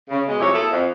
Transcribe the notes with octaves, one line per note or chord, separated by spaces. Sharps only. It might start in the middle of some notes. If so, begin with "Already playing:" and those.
C#3
B2 G#3
F2 F#3 E4 G4 C#5
A#3 E4 G#4 A4
F2